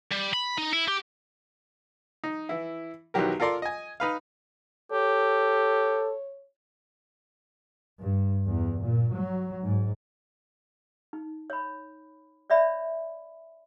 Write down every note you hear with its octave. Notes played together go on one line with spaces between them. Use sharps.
G3
B5
D#4
E4
G4
D#4
E3 E4
B1 D#3 E3 F#3 G4 A#4
F4 A4 A#4 D5 C6
D#5 G#5
D#4 B4 F5
G4 A4 C#5
G2
E2
A#2
F#3
G#2
D#4
C#5 B5
C#5 D5 E5 B5